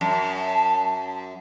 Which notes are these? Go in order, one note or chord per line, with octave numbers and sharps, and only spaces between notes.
F#2 A5